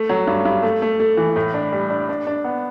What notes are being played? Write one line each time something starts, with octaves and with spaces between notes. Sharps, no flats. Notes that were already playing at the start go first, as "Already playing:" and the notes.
Already playing: A3
F#3
G2
G2
A3
A3
A3
E3
A2
D4
G3
D4
D4
D4
B3